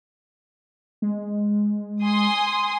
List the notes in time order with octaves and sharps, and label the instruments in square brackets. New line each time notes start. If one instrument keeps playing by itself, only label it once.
[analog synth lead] G#3
[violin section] G#5 C6 D#6